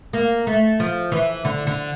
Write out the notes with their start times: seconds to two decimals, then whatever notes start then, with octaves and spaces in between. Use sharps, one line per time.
0.13 A#3
0.47 A3
0.80 F3
1.12 E3
1.45 D3
1.67 D3